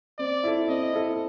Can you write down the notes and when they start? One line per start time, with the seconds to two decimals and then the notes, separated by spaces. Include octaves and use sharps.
0.19 C4 D5
0.44 E4 A4
0.69 C4 D#5
0.93 E4 A4